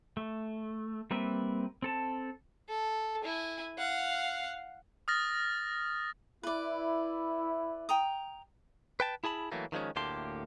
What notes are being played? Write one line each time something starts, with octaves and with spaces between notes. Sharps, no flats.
A3
G3 A#3 C4 B4 E5
C4 A4 A5
A4
E4 G#5
F5 F#5
D#6 F6 A6 A#6
E4 B4 D5
G5 A#5 D#6
B4 G5 A5
E4 G#4 A5 B5
E3 F#3 A3 A#3
D#3 F3 G#3 C#4
D2 A2 A#3 G4 A5 C6